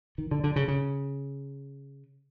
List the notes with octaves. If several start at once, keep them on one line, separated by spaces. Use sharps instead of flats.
D#3
D3
D3
C#3
C#3